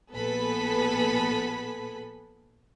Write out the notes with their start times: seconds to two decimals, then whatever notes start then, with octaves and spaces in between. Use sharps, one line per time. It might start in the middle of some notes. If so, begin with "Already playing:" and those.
0.13 A#1 B3 A4 B4 G#5 B5